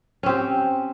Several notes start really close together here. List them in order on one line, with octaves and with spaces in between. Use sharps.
C#4 C4 G4